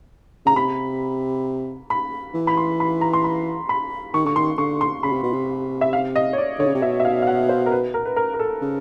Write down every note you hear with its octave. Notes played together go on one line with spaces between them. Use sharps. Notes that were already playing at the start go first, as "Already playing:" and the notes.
C#3 A#5
C3 B5
B5
E3
B5
C6
B5
A#5
C6
B5
B5
D#3 C#6
D3 C#6
D#3 C6
D3 C#6
C6
C#3 B5
C3
B2
C3
E5
F5
D#5
C#5
D5
D3 C#5
C#3
C3
B2 E5
E5
F5
F5
F#5
C5
A#4
B4
A#4
B4
A#4
A#4
A4
C#3